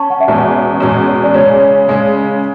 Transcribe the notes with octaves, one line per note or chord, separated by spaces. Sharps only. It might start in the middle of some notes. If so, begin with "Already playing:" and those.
Already playing: C#4 A5 C#6
F#5
E5
E2 B2 G#3 C#4 D5
E2 B2 G#3 C#4
D5
C#3 G#3 C#4 C#5
C#3 G#3 C#4